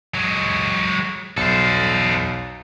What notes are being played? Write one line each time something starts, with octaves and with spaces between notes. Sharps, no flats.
F#3 G#3
B1 A4 C5